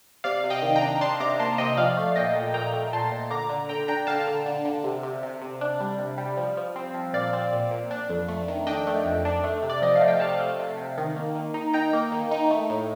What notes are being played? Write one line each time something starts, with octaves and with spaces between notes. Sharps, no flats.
C3 D5 F5
C3
D#5 G5
D#3
G5 A#5
D4
D4 A5 C6
C3 A#5 D6
A#3 A5 C6
C3 D#5 G5
F3 D5 F5
A3
A#2 D#5 G5
A#2
A#2 G5 A#5
A3
A#2 A5 C6
A#2
D3 A#5 D6
D3
D3 G5 A#5
D4 G5 A#5
D3 F5 A5
D3
D3
D3
C3
C3
C3
C3
D4
G3
C3
G3
F3
F3
C4
F3
A#2 D5 F5
C4
A#2
A#2
D4
F2
A3
D#3
D4 D#5 G5
A3
F2
D4
A3
C3
D5
F3 D#5
F5
A3
G5
C3 F5 A5
A3
C3
C3
D#3
A#3
D#3
D#4
D#4 G5 A#5
A#3
D#3
D#4
A3
A2